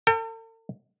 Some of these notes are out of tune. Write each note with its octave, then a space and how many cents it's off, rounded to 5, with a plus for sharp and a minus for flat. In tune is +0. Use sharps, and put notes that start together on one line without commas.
A4 +45 G5 +25